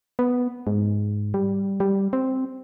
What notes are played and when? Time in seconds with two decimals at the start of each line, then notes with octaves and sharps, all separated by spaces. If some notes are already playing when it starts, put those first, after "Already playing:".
0.19 B3
0.67 G#2
1.34 G3
1.80 G3
2.13 C4